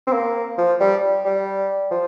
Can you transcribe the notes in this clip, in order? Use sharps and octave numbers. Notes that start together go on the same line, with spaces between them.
C4
A#3
F3
G3
G3
F3